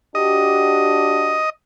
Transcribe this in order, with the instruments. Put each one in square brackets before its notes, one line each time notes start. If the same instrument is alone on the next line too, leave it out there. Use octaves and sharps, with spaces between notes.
[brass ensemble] D4 F#4 G4 [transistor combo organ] D#5